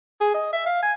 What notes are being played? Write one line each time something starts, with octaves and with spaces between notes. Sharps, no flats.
G#4
D#5
E5
F5
G#5